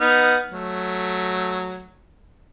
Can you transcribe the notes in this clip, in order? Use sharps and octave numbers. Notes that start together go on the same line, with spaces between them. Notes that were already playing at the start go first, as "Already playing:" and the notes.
B3 D#4 F6
F#3 A3